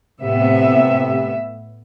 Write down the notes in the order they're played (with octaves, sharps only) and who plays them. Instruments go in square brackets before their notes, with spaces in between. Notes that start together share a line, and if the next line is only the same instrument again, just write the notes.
[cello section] A2 B3 E5 [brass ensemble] C3